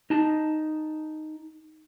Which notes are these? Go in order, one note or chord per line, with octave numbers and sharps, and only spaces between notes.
D#4 A5